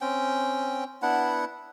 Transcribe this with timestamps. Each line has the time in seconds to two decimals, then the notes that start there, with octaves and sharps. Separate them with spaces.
0.01 C4 C#4 G5
1.02 B3 D4 E4 F#5